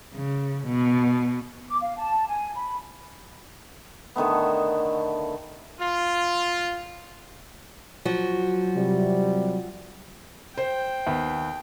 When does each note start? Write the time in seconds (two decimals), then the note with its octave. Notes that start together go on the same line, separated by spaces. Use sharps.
0.14 C#3
0.66 B2
1.68 D6
1.80 F5
1.98 A5
2.27 G#5
2.56 B5
4.16 D3 D#3 A3 B3
5.79 F4
8.05 F3 F#3 F#4
8.76 C3 G3
10.57 C5 G5
11.06 D#2 B3